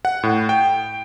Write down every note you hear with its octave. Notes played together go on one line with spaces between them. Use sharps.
F#5
A2
G5